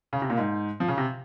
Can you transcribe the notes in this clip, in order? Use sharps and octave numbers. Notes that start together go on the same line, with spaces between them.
C#3
C3
A#2
G#2
F3
C#3
C3